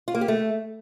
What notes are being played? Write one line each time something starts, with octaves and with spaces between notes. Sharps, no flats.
F4
A#3
G4
A3